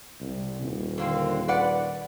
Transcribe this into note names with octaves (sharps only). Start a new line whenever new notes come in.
C2
D#1
D3 A#3 C4
B4 D5 F#5